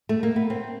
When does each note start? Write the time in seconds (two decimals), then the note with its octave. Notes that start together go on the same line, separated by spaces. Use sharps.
0.09 A3
0.23 A#3
0.36 B3
0.50 C4